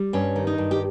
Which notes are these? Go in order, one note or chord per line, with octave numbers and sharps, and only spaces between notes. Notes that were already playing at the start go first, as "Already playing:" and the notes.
Already playing: G3
G2 C#4
D#3
D#4
G2
G4